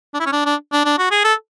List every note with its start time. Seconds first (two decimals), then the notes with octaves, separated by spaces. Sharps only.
0.14 D4
0.20 E4
0.26 C#4
0.32 D4
0.46 D4
0.72 D4
0.85 D4
0.98 F#4
1.11 G#4
1.24 A4